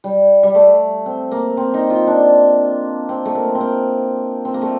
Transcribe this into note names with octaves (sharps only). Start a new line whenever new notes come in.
G3
G3
A3
C4
A#3
C4
D#4
F4
D4
C4
A3
A#3
C4
A#3
C4
A#3
A3